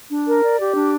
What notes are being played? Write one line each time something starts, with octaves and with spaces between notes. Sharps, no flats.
D4
A#4
D5
G4
D4